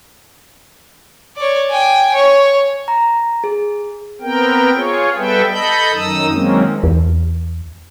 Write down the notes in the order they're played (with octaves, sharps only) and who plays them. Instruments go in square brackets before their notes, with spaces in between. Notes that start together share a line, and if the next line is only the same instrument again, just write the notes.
[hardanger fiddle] C#5 D5
G5 G#5
C#5
[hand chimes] A#5
G#4
[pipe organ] B3 C4 A#4 G5
F4 G#4 C#5
G3 B3 A4 B4 E5 G5
A4 D#5 B5 G6
F#2 D#3 D#4 D#6 E6
D#3 F#3 G#3 A#3 C4 C#4
[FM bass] E2